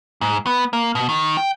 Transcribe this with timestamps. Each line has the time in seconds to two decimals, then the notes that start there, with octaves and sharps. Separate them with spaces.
0.21 G#2
0.46 B3
0.73 A#3
0.95 B2
1.09 D#3
1.37 G5